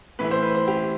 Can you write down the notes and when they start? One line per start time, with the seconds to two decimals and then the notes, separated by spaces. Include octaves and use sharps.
0.19 A2 E3 A3 E4 B4
0.31 C5
0.43 B4
0.55 C5
0.68 G4